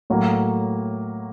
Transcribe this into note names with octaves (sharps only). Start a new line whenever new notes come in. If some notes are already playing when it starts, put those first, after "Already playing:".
A2 F#3 A#3